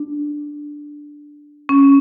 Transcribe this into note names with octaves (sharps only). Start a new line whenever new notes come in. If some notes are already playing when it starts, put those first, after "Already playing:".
Already playing: D4
C#4